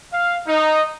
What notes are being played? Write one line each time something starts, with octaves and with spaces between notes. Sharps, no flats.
F5
D#4